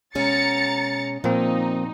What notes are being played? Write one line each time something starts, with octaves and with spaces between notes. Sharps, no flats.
B2 G#3 C#4 A#5 A6 C#7
A#2 F3 A#3 C4 D#4